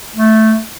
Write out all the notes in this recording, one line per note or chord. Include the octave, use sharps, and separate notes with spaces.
A3